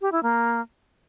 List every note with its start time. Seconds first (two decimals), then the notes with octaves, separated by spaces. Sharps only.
0.01 G4
0.12 E4
0.23 A#3